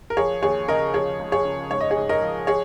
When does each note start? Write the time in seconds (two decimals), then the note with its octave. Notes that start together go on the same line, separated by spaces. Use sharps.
0.10 A#4
0.17 F3 G#4 C#5
0.42 D#2 G#4 C#5
0.68 C#3 A#4 D#5
0.94 F3 G#4 C#5
1.19 C#2
1.32 G#4 C#5
1.45 C#3
1.71 G#2 C#5
1.81 D#5
1.91 G#4 C#5
1.96 G#2
2.09 A#4 D#5
2.22 F3
2.47 G#4 C#5